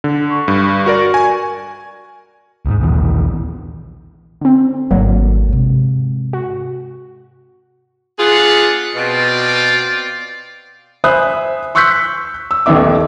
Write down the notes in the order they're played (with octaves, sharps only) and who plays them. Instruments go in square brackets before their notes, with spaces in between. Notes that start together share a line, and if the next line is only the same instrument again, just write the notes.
[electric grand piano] D3
[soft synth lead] C#6
[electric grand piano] G2
F#4 A#4 D5
G#5
[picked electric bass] D2 G#2
A#1 D#2 E3
[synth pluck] D3 C4
[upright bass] G#1 [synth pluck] D3 F#3 A#3
[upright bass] G#2 C3
[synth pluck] F#4
[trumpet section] B3 D4 F#5 [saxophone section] F4 G#4
[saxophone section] B2 [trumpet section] C4 F4 D5
[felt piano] C5 E5 G#5 B5 D#6 F#6
C6 C#6 E6 F#6 G6 B6
E6
D#1 A1 D#3 B3 E5 D6